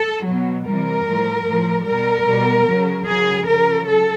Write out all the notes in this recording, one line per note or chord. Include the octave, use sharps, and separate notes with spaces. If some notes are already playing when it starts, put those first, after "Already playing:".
Already playing: A4
B2 F#3
C3 E3 G3 A#4
A2 F3
A2 F3
B2 G3 A#4
B2 G3
C#3 F#3
C#3 F#3 G#4
C#3 F3 A#4
F#3 A4